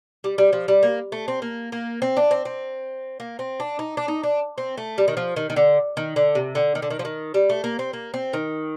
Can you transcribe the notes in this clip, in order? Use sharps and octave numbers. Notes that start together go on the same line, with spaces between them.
G3
G3
F3
G3
A#3
A3
C4
A#3
A#3
C4
D4
C4
C4
A#3
C4
D4
D#4
D4
D#4
D4
C4
A3
G3
D#3
F3
D#3
D#3
D3
D#3
D3
C3
D3
D#3
D3
D#3
F3
D#3
G3
A3
A#3
C4
A#3
C4
D#3